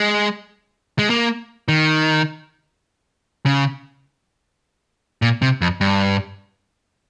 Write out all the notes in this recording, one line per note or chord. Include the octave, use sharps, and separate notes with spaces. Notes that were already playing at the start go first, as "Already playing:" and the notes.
Already playing: G#3
G#3
A#3
D#3
C#3
A#2
C3
F2
G2